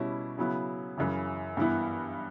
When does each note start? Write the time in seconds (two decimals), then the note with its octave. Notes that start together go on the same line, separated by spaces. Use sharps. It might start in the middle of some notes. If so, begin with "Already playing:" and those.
Already playing: B2 G3 C#4 E4
0.38 C#3 F#3 B3 E4
0.97 F#2 C#3 E3
1.57 G2 E3 B3 E4